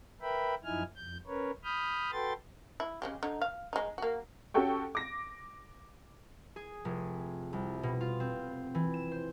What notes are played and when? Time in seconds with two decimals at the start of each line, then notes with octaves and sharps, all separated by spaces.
0.22 A#4 B4 E5 G5 B5
0.64 F#2 F3 D#4 E4 G#5 F6
0.96 F2 G6
1.27 C#4 A#4 B4 C#5
1.64 B5 D#6 F6 G6
2.12 F#4 A4 B4 G5 C6 A6
2.80 E4
3.02 C#3 G#3 G4
3.23 D3 D#4
3.41 F5
3.73 G#3 D#4
3.98 A#3 F#4
4.54 C#4 F#4 G4 A4 G5 C#6
4.95 D6 A#6
6.56 G#4
6.85 F1
7.53 C2
7.83 B2
8.01 F4
8.20 C4
8.75 E3
8.94 E7
9.12 C5